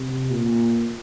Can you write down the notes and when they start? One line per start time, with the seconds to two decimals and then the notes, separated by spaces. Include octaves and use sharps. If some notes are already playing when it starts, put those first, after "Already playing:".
Already playing: C3
0.31 A#2